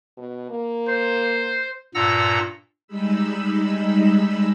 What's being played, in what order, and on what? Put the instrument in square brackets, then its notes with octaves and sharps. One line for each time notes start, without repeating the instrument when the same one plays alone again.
[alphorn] B2
A#3
[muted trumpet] C5
[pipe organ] G2 A#2 F#5 A#5 E6 A#6
[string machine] G3 G#3 D#4 B5 E6